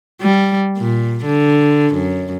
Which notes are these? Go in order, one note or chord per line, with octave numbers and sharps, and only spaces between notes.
G3
A#2
D3
F#2